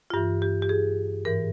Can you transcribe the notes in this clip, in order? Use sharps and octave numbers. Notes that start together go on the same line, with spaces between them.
F4
G2 E3 G4
G4
G4
G#4
G#2 E3 A#4